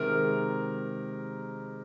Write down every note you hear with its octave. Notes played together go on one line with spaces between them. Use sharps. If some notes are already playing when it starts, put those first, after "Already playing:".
Already playing: C3 D#3 G#3 A#4 A#5